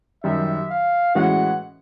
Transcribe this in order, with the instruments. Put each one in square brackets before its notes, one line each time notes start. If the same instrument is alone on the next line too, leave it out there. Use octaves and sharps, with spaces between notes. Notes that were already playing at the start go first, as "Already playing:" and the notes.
[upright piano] F#2 D#3 G3 [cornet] E5
[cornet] F5
[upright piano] A2 E3 G#3 C#4 F#4 [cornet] F#5